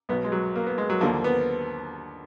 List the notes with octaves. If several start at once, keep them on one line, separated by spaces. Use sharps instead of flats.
B1 B2 B3
G#3
F#3
A#3
B3
G#3
F#3
D#2 D3 F3 A#3
B3